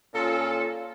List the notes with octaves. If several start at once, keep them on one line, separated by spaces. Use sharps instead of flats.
A#2 C#4 F4 A4